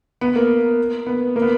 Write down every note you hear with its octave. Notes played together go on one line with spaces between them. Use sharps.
B3
A#3
B3
A#3
B3